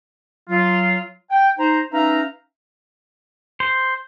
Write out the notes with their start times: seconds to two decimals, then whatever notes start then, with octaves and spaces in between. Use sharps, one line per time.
0.49 F#3 F4
1.31 G5
1.59 D#4 C5 A#5
1.92 C#4 D#4 B4 E5 F5 A#5
3.60 C5